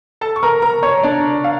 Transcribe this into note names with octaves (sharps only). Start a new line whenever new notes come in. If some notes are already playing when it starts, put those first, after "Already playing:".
A4 A5
C#6
A#4 A#5
A#4 A#5
C#5 C#6
D4 D5
F5